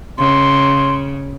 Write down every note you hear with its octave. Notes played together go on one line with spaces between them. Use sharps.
C#3 C6